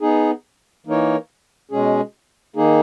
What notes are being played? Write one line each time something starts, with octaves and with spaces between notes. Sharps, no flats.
B3 D#4 G#4
E3 A#3 D#4 A#4 C#5
B2 G#3 C#4 G#4
D#3 A#3 D#4 G#4